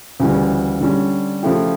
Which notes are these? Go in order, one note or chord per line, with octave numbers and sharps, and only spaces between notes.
D2 C#3 E3 G3
D3 G3 C#4
C#3 F3 A3 E4 G4